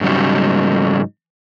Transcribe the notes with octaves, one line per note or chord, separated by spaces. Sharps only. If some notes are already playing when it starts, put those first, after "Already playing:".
G#2 C#3 F#3 G3 D#4